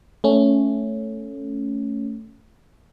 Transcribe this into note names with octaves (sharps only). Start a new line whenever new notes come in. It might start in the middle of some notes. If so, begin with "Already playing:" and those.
A3 C#4